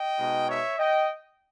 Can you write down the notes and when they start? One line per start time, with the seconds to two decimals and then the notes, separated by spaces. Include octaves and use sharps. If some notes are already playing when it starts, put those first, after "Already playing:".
Already playing: D#5 G5
0.19 B2 G#3 D#4
0.48 C#5 E5
0.78 D#5 G5